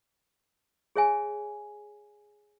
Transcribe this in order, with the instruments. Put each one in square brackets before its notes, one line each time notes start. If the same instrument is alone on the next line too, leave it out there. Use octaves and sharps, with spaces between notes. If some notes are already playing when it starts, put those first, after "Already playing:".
[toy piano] G#4 C#5 E5 G#5